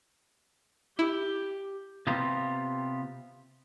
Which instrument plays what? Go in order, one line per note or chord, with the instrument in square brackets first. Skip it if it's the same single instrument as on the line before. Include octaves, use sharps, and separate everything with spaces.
[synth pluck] E4 [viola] G4
[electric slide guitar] C3 B3 F4 G4 A#5